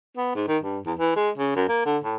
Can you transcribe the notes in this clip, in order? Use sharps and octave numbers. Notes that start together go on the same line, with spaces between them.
B3
G#2
D#3
G2
E2
E3
G#3
C#3
F#2
A#3
D3
A2